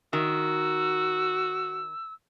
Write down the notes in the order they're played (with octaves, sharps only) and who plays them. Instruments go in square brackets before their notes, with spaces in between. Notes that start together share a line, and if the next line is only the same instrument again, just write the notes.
[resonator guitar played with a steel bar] D#3 [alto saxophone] F#4 [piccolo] E6